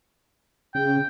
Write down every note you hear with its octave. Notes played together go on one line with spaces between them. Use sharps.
C#3 G5